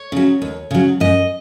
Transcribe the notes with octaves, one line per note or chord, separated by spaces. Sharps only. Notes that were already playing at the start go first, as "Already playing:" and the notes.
Already playing: C#5
C#3 F#3
D#2
C#3 F#3
F#2 D#5